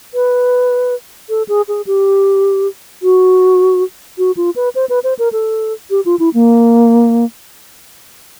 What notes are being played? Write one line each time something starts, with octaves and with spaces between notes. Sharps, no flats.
B4
A4
G#4
G#4
G4
F#4
F#4
F4
B4
C5
B4
C5
A#4
A4
G4
F4
E4
A#3